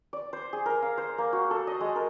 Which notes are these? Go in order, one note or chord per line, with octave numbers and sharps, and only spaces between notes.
D5
C5
G#4
A#4
F5
C5
A#3
F#4
A4
D#5
G#3
A#4